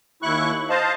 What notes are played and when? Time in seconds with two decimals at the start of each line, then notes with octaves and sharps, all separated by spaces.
0.22 D#2 E4 C#6 F#6
0.70 C5 D#5 F5 A5